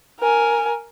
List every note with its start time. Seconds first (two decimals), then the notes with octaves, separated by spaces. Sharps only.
0.20 A#4 G#5